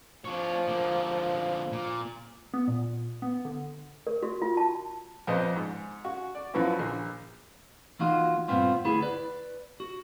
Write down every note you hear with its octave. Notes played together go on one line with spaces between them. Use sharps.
F3 D4 C#5
D3 A#3
A#2
B3
A#2
B3
D3
A#4
F#4
F4
A5
F2 A#2 B3 C5 D#5
G#2
F#4
D5
F#2 E3 F3 B3 E4 F#4
A#1
E3 A#3 D#4 F4 F#4 C6
G2 A#2 B3 C4 F4
D2 B3 E4 G#4 B5
B4 D5
F#4